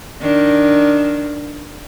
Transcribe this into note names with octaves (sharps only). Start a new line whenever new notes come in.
D#3 D4